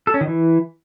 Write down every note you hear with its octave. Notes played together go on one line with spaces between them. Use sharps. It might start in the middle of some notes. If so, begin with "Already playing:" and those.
A4
C#4
D#3
E3